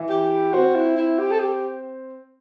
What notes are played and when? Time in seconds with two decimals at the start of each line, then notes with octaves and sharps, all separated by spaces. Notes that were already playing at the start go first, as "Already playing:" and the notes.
Already playing: E3 E4
0.10 G4
0.52 C4 F#4 C5
0.75 E4
0.97 E4
1.19 G4
1.31 A4
1.39 G4